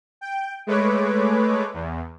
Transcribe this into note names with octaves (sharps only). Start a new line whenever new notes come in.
G5
G#3 A3 B4 C#5 D6
E2